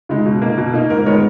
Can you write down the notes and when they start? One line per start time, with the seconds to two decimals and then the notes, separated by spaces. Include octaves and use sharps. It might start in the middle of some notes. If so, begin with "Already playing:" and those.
0.09 C#3 G#3 D#4
0.26 B2
0.42 A#3 D#4
0.58 B2
0.74 A#3 D#4
0.90 G#2 A#4
1.06 D#3 G#3 B3 A#4 C#5